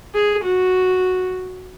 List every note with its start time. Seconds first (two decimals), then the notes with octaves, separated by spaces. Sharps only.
0.14 G#4
0.44 F#4